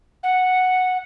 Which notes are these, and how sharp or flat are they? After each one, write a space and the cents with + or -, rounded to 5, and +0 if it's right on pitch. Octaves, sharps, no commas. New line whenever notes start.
F#5 -5